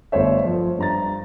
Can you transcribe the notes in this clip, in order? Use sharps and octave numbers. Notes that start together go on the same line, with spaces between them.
G1 A3 C5 C#5 E5
F3
G2 A#5 A6